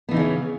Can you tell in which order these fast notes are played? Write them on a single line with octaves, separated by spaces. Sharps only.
B3 E3 D#4 C#3 C#4